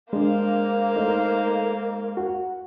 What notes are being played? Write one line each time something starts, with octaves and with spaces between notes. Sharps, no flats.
G#3 A#3 D4 C5 F5
A3 D#4
F#4 F#5